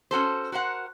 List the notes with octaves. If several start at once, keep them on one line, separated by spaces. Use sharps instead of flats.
C#4 F#4 A4 C5
F#4 A#4 C5 F#5